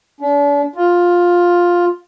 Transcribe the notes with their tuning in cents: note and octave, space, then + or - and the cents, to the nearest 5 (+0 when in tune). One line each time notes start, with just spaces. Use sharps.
D4 -40
F4 +10